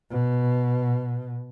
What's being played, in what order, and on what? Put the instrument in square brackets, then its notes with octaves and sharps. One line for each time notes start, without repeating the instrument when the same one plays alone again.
[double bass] B2